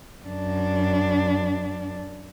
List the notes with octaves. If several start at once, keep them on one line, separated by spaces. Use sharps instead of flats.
F#2 D4